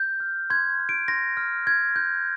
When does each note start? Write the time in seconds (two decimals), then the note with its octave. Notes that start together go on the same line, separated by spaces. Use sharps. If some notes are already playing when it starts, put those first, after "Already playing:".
Already playing: G6
0.20 F6
0.50 C6 G#6
0.80 F6
0.89 D7
1.08 C6 A#6
1.37 F6
1.66 C6 G#6
1.96 F6 G6